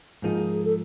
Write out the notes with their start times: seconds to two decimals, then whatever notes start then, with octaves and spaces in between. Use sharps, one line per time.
0.22 G#2 F3 A#3 D#4 G#4
0.65 A4